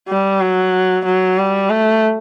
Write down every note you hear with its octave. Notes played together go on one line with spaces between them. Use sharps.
G3
F#3
F#3
G3
A3